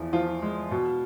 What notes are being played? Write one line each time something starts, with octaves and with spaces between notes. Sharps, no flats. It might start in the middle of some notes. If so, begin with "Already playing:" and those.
Already playing: E2 F3
F3 F4
G#3
B2